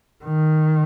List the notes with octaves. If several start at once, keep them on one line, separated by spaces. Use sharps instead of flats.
D#3